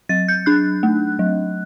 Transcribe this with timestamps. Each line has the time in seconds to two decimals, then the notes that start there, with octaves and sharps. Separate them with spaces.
0.09 F#3 A6
0.28 G6
0.46 D4 F#6
0.83 A3
1.19 F#3